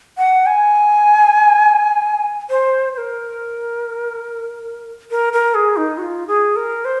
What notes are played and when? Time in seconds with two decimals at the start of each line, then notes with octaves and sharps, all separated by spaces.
0.18 F#5
0.46 G#5
2.50 C5
2.94 C5
2.98 A#4
5.11 A#4
5.33 A#4
5.55 G#4
5.77 D#4
5.98 F#4
6.03 F4
6.28 G#4
6.56 A#4
6.85 C5